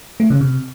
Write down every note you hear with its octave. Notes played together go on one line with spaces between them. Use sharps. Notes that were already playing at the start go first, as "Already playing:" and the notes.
A3
C#3
C3